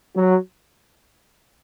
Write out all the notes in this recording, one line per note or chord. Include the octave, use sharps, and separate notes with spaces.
F#3